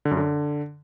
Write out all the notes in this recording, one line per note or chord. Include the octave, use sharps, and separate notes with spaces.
D3
F#2
D3